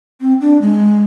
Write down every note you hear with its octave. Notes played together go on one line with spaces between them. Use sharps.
C4
D4
G#3